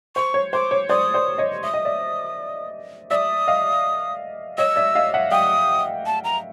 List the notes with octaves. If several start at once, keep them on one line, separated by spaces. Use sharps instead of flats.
C5 C#6
C#5
C5 D6
C#5
C5 D5 D#6
C5 D5
C#5 D#5
E5 D#6
D#5
D5 E5
D5 E5 D#6 E6
D#5 F5
C#5 D#5 E6
D5 E5
D#5 F5
E5 F#5
F5 G5 D#6
A5
A#5